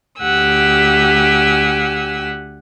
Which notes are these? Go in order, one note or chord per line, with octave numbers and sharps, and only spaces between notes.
D2 G4 F#5 G#5 E6